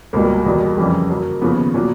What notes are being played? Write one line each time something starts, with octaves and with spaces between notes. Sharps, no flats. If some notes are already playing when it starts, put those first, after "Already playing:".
C#2 B2 G3 A#3
E2 B2 G3
F2 C#3 E3 G3
F#2 C#3 F#3
D#2 C#3 F3 B3
A#2 F#3